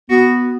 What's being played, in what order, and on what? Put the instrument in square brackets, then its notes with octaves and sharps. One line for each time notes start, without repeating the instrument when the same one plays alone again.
[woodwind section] B3 [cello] F#4